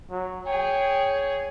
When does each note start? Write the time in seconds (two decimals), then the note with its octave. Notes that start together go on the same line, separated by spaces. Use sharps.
0.11 F#3
0.46 G#4 C#5 G5